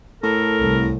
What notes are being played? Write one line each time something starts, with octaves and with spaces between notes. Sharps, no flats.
A2 A4 A#4
C2